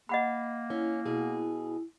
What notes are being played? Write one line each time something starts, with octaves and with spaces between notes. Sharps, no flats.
A#3 D#5 F#5 B5
C#4 E4
B2 G#4